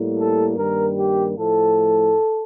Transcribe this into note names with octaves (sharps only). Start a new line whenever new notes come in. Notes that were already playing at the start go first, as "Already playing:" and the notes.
Already playing: A2 G3 A#3
A4
G2 D#3 G3 A#3 A#4
G4
A2 F3 A3 A4